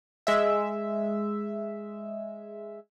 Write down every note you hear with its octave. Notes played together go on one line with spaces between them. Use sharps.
G#3 E5